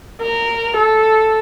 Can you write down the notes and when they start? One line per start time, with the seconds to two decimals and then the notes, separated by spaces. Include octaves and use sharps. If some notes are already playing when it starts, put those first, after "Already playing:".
0.21 A#4
0.76 A4